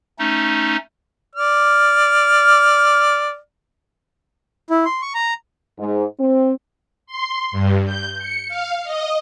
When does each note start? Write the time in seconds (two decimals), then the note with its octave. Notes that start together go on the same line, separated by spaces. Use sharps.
0.19 A3 C#4 D#4
1.36 D5 F6
4.70 E4
4.85 C6
5.02 C#6
5.14 A#5
5.79 G#2
6.19 C4
7.06 C6
7.52 G2
7.85 G6
8.18 C#7
8.48 F5
8.84 D#5